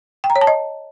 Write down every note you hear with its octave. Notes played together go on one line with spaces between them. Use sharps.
G5
A#5
C#5
A5
D#5